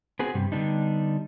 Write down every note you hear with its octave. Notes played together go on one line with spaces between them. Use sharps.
B3 C4 F#4 G#4
G2 C3 G3
D3 G3 B3 D4 D#4